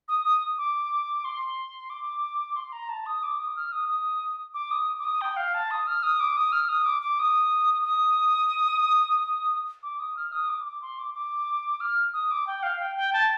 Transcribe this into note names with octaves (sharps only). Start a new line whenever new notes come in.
D#6
D#6
D6
C6
D6
C6
A#5
A5
D#6
D6
D#6
F6
D#6
D#6
D6
D#6
D6
D#6
G5
F5
A5
D#6
F6
D#6
D6
D#6
F6
D#6
D6
D6
D#6
D#6
D6
D#6
F6
D#6
D6
D6
C6
D6
D6
F6
D#6
D6
G5
F5
G5
G5
A5